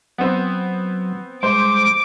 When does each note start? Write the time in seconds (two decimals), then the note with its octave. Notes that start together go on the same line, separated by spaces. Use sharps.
0.18 F#3 B3 C4
1.43 G3 G#3 C5 D6